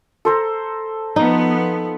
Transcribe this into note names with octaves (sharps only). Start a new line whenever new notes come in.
A4 C5 A#5
F3 B3 D#4